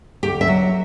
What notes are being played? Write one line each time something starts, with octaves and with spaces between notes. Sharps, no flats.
D2 G4
E5
F#3